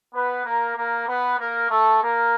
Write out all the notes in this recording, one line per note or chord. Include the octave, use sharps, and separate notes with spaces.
B3 B4
A#3 A#4
A#3 A#4
B3 B4
A#3 A#4
A3 A4
A#3 A#4